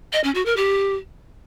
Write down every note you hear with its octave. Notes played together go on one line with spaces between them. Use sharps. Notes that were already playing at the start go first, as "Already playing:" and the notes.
D#5
C#4
F#4
A#4
G4